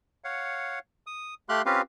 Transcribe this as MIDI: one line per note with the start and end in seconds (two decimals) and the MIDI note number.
0.24 0.79 73
0.24 0.79 77
0.24 0.79 78
1.07 1.34 87
1.49 1.62 57
1.49 1.62 67
1.49 1.62 77
1.49 1.62 84
1.49 1.62 90
1.66 1.82 60
1.66 1.82 61
1.66 1.82 65
1.66 1.82 67
1.66 1.82 71
1.66 1.82 77